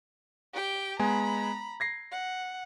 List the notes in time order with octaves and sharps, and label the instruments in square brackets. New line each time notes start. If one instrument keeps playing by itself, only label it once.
[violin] G4 G5
[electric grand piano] G#3 B3 G#5 [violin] A#5 B5
[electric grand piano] G#6 A#6 C7
[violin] F#5